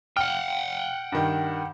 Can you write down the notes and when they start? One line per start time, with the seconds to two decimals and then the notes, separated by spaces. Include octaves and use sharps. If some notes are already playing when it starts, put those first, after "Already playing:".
0.17 F#5 G5 F6
1.12 G2 D#3